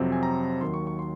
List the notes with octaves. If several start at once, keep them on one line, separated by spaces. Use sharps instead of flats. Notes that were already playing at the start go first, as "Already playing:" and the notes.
Already playing: F2 C3 F#3 C4
G#5
A#5
D#2 D#3 F#3 C6
C#6
C#6
C6